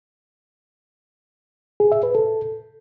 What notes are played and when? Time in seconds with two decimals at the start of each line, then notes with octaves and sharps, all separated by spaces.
1.80 G#4
1.92 E5
2.03 B4
2.15 A4